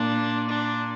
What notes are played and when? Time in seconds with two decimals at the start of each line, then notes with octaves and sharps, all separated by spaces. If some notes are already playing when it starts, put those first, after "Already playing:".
Already playing: A#2 D4
0.49 D4